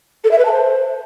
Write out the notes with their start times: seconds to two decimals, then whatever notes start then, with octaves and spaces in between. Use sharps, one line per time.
0.24 A4
0.31 E5
0.38 B4
0.45 A5
0.52 C5